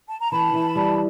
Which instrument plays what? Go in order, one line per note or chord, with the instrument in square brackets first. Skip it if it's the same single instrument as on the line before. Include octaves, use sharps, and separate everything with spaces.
[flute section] A5
A#5
[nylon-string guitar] E3 [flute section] A5 B5
[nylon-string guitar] E3
G3